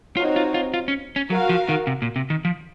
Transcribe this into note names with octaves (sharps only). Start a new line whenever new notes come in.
C4 D#4 F4 F#4 C#5
F4
F4
F4
C#4
C#4
F#3 F#4 A#4 F5
F3
D#3
C3
A#2
C3
D#3
F3